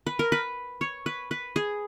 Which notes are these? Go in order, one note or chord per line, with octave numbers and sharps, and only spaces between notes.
B4
A#4
B4
C#5
B4
B4
G#4